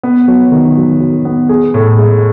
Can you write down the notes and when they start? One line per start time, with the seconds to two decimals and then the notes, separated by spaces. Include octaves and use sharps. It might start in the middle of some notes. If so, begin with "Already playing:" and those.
0.03 B3
0.28 F#3
0.52 D#3
0.77 F#3
1.00 F#3
1.25 B3
1.49 G#4
1.74 A2
1.98 G#3